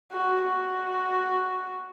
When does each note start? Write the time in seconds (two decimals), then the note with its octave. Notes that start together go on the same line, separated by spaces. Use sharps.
0.12 F#4
0.44 F#4